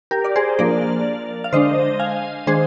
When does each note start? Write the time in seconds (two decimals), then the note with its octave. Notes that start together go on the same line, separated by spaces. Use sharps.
0.11 G4 A#4
0.24 D5
0.36 G#4 C5
0.59 F3 A#3 D4 A#4 D5
1.44 F5
1.53 D3 G#3 D4 C5 D#5
1.99 F5 G#5
2.47 D#3 G#3 D4 G#4 C5